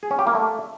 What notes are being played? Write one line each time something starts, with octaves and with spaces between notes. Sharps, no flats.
G#4
C#4
G4
A#3
A3